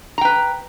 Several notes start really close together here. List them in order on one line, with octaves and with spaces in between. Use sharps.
A#5 G5 B4